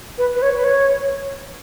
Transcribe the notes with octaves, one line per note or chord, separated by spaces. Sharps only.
B4
B4
C#5
B4
C#5